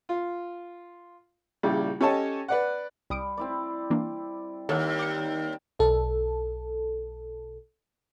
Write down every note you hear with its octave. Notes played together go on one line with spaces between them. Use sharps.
F4
A#1 C#3 G3 E4
C#4 G4 A4 C#5 D#5 A5
B4 D5 F#5
C2 G3 D#6 D7
C4 E4 D5
E3 A#3 D4
D#2 A4 C#5 F#5
G5 D6 C#7
B1 A4